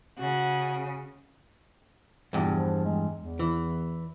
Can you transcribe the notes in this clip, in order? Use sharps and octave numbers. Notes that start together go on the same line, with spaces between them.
C#3 F#4
E2 G2 A#2
F3
G#3
E2
E3